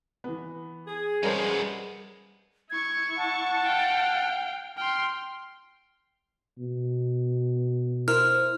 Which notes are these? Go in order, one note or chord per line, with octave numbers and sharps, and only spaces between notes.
E3 B3
G#4
G3 G#3 B3 C#4 A#4 C5
E4 C#6 G#6
F#5 A5
F5 G5
G5 C6 F6
B2
E4 A#4 C5 F6